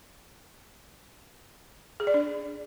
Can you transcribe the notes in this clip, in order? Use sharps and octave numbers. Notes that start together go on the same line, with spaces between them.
G#4
D5
D4